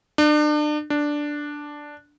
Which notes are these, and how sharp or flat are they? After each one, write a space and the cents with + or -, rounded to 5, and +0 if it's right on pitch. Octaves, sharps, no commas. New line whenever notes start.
D4 +35
D4 +0